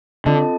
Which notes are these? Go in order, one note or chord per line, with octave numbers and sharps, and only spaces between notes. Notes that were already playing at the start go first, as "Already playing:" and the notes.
D3 C4 F4 A4 D#5 A5